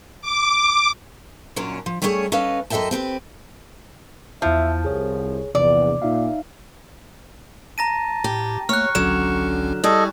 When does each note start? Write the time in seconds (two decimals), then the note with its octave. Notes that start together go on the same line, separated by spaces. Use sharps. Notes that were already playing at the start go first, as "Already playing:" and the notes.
0.21 D6
1.56 F#2 A#2 F#3 C#4 D4
1.86 F3
2.02 G3 A3 B3 C#4 G#4 C#5
2.32 C#4 A4 B4 D#5 F5
2.70 F#2 A4 D#5 E5 G5 A5
2.91 C4 G4 G#4 B4
4.42 E2 F3 E4 E5 A5
4.85 C2 G#4 C#5
5.55 A#1 E2 C3 D5
6.02 A#2 D#4 E5 F5
7.78 A5 A#5 A#6 D#7
8.24 A2 G4
8.69 A3 A#3 C#5 C#6 F6 F#6
8.95 G#1 C#2 D3 F#3 C#4 E7
9.84 G3 E4 G#4 A4 D#5 C#6